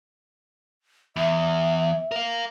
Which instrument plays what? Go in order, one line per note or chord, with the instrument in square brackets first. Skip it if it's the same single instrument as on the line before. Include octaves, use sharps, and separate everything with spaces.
[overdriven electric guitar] E2 [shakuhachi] E5
[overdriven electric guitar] A#4 F5